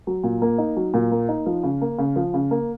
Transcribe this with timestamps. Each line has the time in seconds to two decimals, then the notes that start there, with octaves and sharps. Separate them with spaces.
0.07 F#3
0.24 A#2
0.42 A#3
0.58 D#4
0.76 F#3
0.94 A#2
1.12 A#3
1.29 D#4
1.46 F3
1.63 C#3
1.81 A#3
1.98 C#3
2.16 F3
2.34 C#3
2.51 A#3